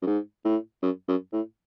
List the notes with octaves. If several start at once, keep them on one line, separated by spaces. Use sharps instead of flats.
F#2
G#2
A2
F#2
F#2
A2